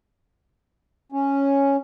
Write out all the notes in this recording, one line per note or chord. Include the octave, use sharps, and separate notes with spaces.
C#4